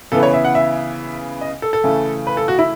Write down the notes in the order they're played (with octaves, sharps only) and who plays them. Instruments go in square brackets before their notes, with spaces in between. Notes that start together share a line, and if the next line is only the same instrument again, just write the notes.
[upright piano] C#3 E3 B3 A4
C#5
E5
F#5
E5
D#5
A4
A4
C#3 E3 A3 C#4
B4
A4
F#4
E4